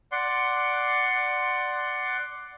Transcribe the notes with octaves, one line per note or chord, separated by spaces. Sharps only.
D5 F#5 C6